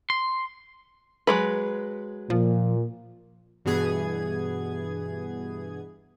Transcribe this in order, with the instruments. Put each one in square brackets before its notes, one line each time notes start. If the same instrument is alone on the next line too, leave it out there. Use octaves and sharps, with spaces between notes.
[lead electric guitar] C6
[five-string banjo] F#3 G#3 B4
[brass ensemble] A#2 [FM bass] F3
[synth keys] G2 B2 E3 B3 G#4 G#6